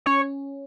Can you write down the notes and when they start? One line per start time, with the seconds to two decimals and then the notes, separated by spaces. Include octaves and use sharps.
0.06 C#4 C#5